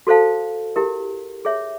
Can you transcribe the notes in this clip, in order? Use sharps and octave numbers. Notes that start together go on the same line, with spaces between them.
F#4 A4 C5 F5 A5
E4 G4 A#4
G#4 C#5 E5